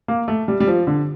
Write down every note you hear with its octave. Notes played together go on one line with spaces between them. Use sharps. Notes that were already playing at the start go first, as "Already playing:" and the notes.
A#3
A3
G3
G3
F3
D3